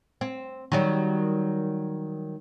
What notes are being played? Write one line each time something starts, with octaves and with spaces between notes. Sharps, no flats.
C4
D#3 F#3 G3